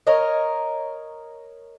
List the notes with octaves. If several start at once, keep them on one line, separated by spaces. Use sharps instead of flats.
A#4 C#5 D#5